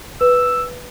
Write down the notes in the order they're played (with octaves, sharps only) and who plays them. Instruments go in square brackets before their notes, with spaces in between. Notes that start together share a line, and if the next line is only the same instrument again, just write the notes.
[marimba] B4 [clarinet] E6